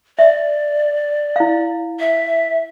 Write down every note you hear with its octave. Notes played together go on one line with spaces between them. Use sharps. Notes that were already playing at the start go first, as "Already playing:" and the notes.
D5 E5
E4 F5
E5